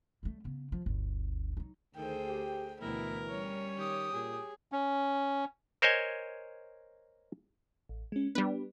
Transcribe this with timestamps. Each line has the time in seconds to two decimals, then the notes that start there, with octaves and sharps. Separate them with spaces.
0.23 G3 A3
0.44 C#3 B3
0.72 F3
0.86 G1 D2
1.57 F#3 D#4
1.96 D2 D#3 G#4 A4 C5 G5
2.27 G4
2.81 D2 B2 E3 E4 A#4
3.28 G3 C#4 C#5
3.77 D#3 G4 D#6
4.13 A#2 G#4
4.72 C#4
5.82 A#4 C5 C#5 D#5 G#5
7.89 A1
8.12 G#3 C#4
8.35 G3 B3 D4 B4